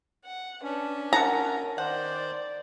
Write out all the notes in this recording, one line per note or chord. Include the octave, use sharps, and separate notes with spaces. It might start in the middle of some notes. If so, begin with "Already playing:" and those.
F#5
C#4 D4 B4
F#4 A#4 F#5 A5 A#5
D#3 C5 D5 F#5